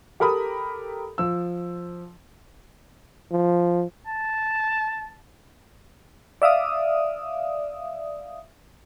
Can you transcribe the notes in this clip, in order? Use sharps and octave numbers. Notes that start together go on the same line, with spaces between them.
G4 A4 A#4 A#5 B5 D#6
F3 E6
F3
A5
D5 E5 F5 D#6